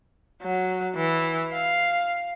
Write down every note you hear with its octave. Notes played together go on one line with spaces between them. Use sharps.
F#3
E3
F5